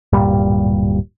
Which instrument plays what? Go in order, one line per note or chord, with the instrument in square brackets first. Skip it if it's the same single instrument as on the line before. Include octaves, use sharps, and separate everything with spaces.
[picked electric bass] D1 G2 A#2 G3